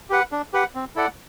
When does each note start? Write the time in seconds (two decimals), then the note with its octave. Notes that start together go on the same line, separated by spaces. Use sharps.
0.10 G4 B4 F#5
0.32 D4
0.53 G4 B4 F#5
0.75 C4
0.96 E4 A4 D5 F#5